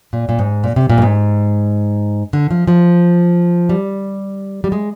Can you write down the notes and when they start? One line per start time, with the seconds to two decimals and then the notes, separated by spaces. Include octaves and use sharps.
0.13 A#2
0.29 A#2
0.39 G#2
0.64 A#2
0.76 C3
0.90 A#2
0.98 G2
1.02 G#2
2.33 D3
2.50 F3
2.67 F3
3.69 G3
4.64 G3
4.72 G#3